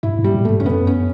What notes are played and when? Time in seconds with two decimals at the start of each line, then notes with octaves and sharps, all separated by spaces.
0.03 G2 E4
0.19 G2
0.24 G3
0.35 A2
0.45 A3
0.50 G2
0.60 C#4
0.66 F#2 B3
0.87 C#4